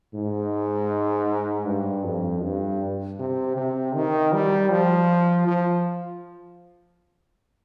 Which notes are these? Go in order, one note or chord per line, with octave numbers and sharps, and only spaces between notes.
G#2
G2
F2
G2
C3
C3
D#3
G3
F3
F3